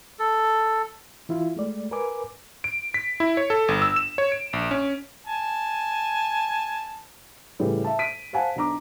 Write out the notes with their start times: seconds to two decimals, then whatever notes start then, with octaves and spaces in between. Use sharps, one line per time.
0.19 A4
1.29 E3 E4 F4
1.56 G#3 A3 D5
1.91 A#4 B4 G#5 D6
2.64 D7
2.94 B6
3.20 E4
3.37 C#5
3.50 A4
3.68 G1
3.82 E6
3.96 E7
4.18 C#5
4.32 D7
4.53 A#1
4.71 C#4
5.27 G#5 A5
7.59 A2 C#3 E3 G3
7.84 E5 A5
7.99 B6 D7 D#7
8.33 C5 F5 F#5 G#5 A5
8.56 B1 D4 A#5 D6